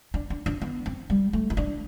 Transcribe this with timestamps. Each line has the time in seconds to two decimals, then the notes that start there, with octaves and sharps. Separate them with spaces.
0.14 D4
0.30 D4
0.46 D4
0.61 B3
0.86 C4
1.10 G3
1.33 A3
1.50 E4
1.57 D4